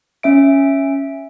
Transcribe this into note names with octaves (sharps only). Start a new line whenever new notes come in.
C#4 E5 D7